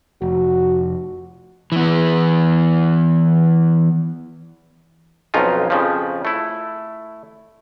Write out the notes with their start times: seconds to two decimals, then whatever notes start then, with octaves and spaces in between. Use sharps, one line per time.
0.22 F1 F#4
1.72 E3 B3
5.34 B1 F2 C#4 D#4 F4
5.70 F2 C#3 F3
6.25 A3 E4